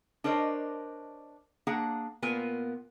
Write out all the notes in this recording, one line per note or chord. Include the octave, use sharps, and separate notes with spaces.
D4 A#4 C5 C#5 D#5
A#3 D4 G#4 F#5 A#5
A#2 B3 F4 A#4 G#5